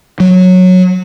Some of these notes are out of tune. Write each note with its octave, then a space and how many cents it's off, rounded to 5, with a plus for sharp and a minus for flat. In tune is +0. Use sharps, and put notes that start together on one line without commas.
F#3 -10